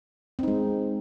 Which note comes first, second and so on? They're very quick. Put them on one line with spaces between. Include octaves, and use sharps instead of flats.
C4 D#4 G#3